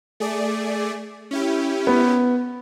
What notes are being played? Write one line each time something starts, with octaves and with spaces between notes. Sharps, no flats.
A3 G#4 D5
C#4 E4 G4
B3